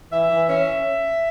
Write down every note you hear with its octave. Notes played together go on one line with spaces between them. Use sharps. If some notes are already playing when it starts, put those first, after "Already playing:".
E3 E5
E3
C#4 E5